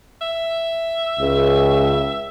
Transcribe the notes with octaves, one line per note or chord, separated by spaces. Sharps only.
E5
C#2